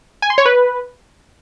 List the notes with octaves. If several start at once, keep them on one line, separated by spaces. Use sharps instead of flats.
G#5
C6
C#5
B4